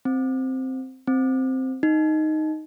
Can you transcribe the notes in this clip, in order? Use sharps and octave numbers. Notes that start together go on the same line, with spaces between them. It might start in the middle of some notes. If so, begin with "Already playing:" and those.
C4
C4
D#4